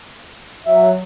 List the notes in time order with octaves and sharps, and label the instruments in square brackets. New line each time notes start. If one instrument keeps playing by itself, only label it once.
[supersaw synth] F#3 [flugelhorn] E5